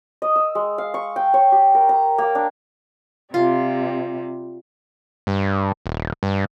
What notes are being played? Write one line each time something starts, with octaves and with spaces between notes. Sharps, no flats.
D#5
E6
G#3
F5
C#6
G5
C#5
G4
A#4
A#5
A#3
D4
C3 G3 F4
G2
D#1
G2